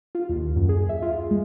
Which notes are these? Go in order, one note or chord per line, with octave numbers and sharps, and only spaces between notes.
F4
D#2
F#2
G#4
E5
F4
G#3